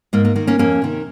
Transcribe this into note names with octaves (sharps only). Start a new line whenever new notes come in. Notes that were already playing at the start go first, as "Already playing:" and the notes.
G#2 A#3
A#3
D#3 A#3
A#3 C#4
F2 A#3 C#4
C3 D#3